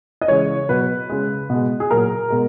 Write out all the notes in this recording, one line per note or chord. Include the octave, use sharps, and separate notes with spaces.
D#5
C#3 E3 G#3 C#5
B2 F#3 B4
C#3 G#3
B2 G#3
G#4
A#2 F#3 A#4
B2 G#3